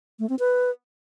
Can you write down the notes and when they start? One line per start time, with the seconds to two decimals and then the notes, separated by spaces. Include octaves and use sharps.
0.19 A3
0.29 C4
0.39 B4